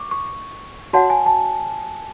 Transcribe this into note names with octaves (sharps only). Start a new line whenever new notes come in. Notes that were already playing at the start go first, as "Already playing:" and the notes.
Already playing: C#6 D6
C#6
F#4 C#5 F#5 A5
G#5
A5